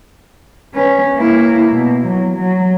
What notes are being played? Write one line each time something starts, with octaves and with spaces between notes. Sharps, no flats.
C#4 B4
A#3 E4
B2
F#3
F#3